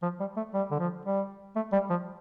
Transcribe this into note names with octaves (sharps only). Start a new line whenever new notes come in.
F3
G3
A3
G3
D3
F3
G3
A3
G3
F3